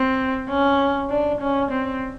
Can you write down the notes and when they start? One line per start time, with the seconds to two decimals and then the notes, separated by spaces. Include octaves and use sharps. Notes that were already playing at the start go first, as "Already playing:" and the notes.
Already playing: C4
0.50 C#4
1.10 D4
1.41 C#4
1.71 C4